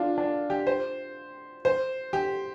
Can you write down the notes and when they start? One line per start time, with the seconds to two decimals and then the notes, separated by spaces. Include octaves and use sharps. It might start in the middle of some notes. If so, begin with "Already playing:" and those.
Already playing: D4 F4
0.18 D4
0.50 G4
0.67 C5
1.65 C5
2.13 G4